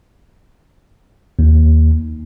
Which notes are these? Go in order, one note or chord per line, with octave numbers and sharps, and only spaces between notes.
D#2